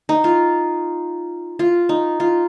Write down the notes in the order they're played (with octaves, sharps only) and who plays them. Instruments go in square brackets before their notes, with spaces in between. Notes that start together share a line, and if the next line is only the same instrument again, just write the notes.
[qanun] D#4
F4
F4
D#4
F4